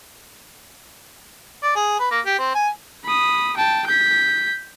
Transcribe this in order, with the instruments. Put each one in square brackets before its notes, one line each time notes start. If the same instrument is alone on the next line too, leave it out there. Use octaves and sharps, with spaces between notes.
[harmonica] D5
G#4
B4
A#3
G4
C4
G#5
[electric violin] B5 D#6
G5 A5
G6 B6